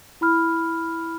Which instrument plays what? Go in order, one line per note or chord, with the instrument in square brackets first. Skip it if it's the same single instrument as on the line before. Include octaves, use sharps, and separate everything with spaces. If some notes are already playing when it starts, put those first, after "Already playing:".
[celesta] E4 B5 F6